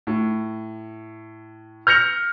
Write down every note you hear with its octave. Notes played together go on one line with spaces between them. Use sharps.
A2
F6 G6 A#6 C#7 F7